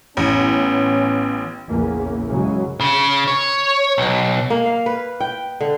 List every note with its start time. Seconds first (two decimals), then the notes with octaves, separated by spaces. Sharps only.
0.17 A1 B3 C#4
1.69 A#1 E2 C#3 E3 A#3
2.29 F#2 C#3 F#3 G#3
2.81 C#3
3.28 C#5
3.98 B1
4.50 A#3
4.66 F5
4.86 B4
5.21 G5
5.61 D3